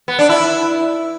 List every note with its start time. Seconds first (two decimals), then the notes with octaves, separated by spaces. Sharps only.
0.08 B3
0.19 D4
0.29 E4